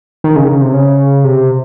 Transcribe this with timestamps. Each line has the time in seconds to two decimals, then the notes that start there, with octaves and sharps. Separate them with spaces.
0.24 D#3
0.36 C#3
0.44 D#3
0.49 C#3
0.61 C3
0.73 C#3
1.24 C3